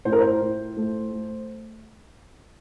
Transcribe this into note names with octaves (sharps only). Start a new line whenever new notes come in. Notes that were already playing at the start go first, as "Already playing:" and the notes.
A2 C5
A#4
C5
A2
A3
A3